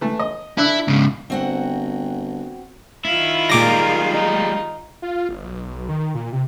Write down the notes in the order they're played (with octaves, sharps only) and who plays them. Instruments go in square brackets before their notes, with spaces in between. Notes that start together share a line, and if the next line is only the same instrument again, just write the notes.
[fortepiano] E3 A3
D#5
[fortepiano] D4 E5 F#6 [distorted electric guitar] E4
[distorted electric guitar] G#2 C#3
[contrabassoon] G1 [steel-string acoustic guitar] C4 F#4 F#5
[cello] D#3 F4 [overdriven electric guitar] E4
[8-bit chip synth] A#2 D6 A#6 [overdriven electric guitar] G3 G#3 [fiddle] A#4
[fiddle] D#4
[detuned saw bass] F4
G1
B1
D#3
A#2
C3